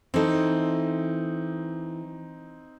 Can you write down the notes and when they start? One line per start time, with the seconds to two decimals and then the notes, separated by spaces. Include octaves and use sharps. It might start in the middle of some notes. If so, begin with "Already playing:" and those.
0.14 E3 C4 D#4 A4